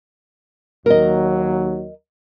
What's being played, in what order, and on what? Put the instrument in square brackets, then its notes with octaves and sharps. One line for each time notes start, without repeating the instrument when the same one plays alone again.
[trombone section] D#2 F#3 [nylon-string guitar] A#4 D#5